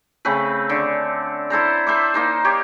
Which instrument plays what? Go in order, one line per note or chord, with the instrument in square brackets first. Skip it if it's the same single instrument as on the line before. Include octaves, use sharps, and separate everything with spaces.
[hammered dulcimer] C#3 A3 C4 B4
D3
E4 A4 C5 A#5
B4 C5 E5 D6
A#3 D#4 C5
G4 C#5